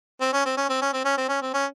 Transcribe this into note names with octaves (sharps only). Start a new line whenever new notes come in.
C4
C#4
C4
C#4
C4
C#4
C4
C#4
C4
C#4
C4
C#4